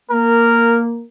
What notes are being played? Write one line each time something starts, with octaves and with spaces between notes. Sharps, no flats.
A#3 A#4